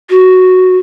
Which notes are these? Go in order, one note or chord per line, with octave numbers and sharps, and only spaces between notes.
F#4